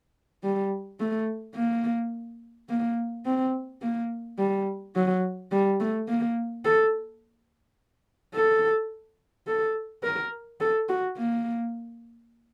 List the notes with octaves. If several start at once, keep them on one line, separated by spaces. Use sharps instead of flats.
G3
A3
A#3
A#3
C4
A#3
G3
F#3
G3
A3
A#3
A4
A4
A4
A#4
A4
F#4
A#3